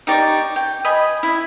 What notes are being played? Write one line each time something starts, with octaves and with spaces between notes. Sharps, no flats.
D#4 G4 D5 C#6
G5
D#5 G#5 B5
E4